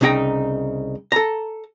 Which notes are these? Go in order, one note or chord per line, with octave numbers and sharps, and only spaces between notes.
C2 C#3 D#4 G#4 G5 A#5
A4 A#5